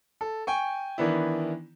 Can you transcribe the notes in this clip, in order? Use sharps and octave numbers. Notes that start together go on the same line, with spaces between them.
A4
G5 G#5 C#6
D#3 E3 B3 D4 E4